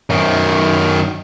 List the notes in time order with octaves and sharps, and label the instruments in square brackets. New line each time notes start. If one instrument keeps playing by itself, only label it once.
[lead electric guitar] F#2 D#3